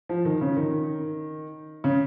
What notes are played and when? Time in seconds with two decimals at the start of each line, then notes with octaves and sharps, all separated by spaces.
0.09 F3
0.25 D#3
0.41 C#3
0.57 D#3
1.84 C#3